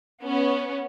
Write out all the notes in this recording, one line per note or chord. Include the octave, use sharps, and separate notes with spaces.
B3 C#4